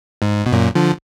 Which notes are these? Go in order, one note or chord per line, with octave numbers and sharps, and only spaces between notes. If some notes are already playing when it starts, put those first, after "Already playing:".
G#2
B2
F#2 A#2
D3 F3